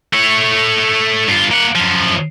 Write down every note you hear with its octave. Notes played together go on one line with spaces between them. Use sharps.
A3 C#5
G2 F4
A#3 F#5
F#2 F3